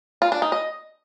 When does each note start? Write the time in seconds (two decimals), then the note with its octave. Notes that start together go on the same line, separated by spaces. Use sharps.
0.22 F4
0.32 D4
0.42 D#4
0.52 D#5